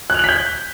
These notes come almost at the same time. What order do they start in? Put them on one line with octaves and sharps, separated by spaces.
F#6 F7 F#7 B6 G6